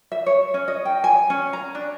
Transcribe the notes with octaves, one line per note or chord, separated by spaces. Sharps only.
E5
C#5
C#4
D#5
G5
G#5
C#4
A#5
D4